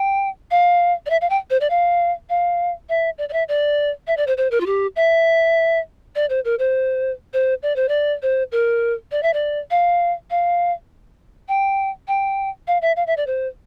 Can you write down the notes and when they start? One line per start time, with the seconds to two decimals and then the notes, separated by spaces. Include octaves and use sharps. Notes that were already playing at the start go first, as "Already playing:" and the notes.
Already playing: G5
0.51 F5
1.06 D5
1.10 E5
1.21 F5
1.30 G5
1.50 C5
1.61 D5
1.70 F5
2.30 F5
2.89 E5
3.18 D5
3.29 D5
3.33 E5
3.49 D5
4.07 E5
4.17 D5
4.27 C5
4.37 C5
4.51 A#4
4.60 F4
4.66 G4
4.96 E5
6.15 D5
6.30 C5
6.45 A#4
6.59 C5
7.33 C5
7.63 D5
7.76 C5
7.89 D5
8.22 C5
8.52 A#4
9.12 D5
9.23 E5
9.33 D5
9.71 F5
10.31 F5
11.49 G5
12.08 G5
12.68 F5
12.82 E5
12.96 F5
13.07 E5
13.17 D5
13.27 C5